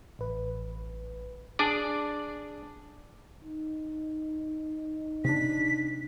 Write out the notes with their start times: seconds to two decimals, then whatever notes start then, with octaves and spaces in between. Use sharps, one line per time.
0.19 A1 B4
1.59 D4 G#4 D5
3.44 D#4
5.24 C3 D4 B6